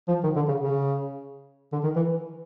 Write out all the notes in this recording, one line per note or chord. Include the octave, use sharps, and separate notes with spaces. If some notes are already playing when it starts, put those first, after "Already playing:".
F3
D#3
D3
C#3
C#3
D3
D#3
E3